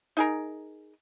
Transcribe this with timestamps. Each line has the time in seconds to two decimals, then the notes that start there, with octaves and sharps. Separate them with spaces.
0.17 D#4 G#4 A#4